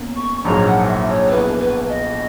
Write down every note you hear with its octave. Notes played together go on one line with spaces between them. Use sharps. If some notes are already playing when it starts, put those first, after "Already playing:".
Already playing: B2 A#3 C#4
C#6
A#1 G#2 F#3 A#3 A#5
F#5
E5
C#5
C#5
B1 B2 A#3 E4 G#4 B4
B4
D#5